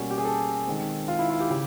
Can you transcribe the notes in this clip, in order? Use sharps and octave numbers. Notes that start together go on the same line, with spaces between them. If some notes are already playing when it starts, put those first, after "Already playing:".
Already playing: B2 G3 A#3 C#4
G4
G#4
A4
D#3 G#3 C4
F4
E4
F4
G4
C#3 G4